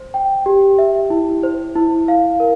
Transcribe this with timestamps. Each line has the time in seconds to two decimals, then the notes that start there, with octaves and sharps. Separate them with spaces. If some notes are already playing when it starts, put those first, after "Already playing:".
Already playing: C5
0.14 G5
0.46 G4
0.79 E5
1.10 E4
1.43 C5
1.75 E4
2.08 F5
2.40 A#4